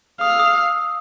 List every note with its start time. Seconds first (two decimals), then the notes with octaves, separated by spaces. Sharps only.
0.20 F5 D#6
0.30 E6
0.40 D#6